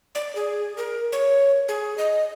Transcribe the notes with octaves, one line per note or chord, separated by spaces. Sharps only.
D5
G#4
A#4
C#5
G#4
D#5